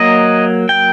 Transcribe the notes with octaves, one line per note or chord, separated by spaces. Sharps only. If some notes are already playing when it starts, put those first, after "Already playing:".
Already playing: F#3 A#3 D#5
G5